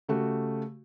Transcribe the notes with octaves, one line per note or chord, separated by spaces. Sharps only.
C#3 A3 F#4 G4